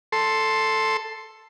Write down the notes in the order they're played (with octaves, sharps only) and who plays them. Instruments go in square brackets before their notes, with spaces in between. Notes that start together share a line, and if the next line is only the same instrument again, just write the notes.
[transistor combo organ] A4 C6